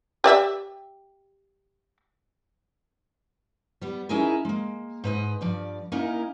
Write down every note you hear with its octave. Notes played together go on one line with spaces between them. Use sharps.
G4 D5 E5
G3 B3
C#4 D#4 E4 G#4 A#4
G#3 A#3
G#2 B4 D#5
G2 F3 D5
A#3 C#4 D#4 E4 A#4 D#5